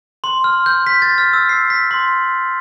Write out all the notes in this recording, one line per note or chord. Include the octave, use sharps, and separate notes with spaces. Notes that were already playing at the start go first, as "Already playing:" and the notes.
C6
F6
G6
B6
A6
F6
E6
C7
B6
C6